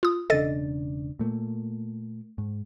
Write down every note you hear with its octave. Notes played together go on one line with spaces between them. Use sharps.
F4 D#6
E1 C#3 D4 A4 D#5 A6
A#2 A3 A#3
G#2